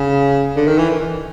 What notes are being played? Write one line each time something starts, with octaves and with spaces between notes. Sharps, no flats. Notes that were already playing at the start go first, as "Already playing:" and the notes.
Already playing: C#3
D3
D#3
E3